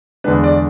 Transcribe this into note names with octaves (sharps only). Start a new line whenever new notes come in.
E2 D3 G#3 D4 B4
D5